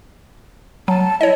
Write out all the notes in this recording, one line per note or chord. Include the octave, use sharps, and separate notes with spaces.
F#3 A5
E4 C#5 D#5